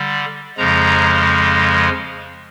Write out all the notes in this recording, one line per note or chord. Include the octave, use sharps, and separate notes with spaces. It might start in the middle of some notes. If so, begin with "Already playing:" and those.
Already playing: D3 G3
F2 C#3 F3 G#3 A#5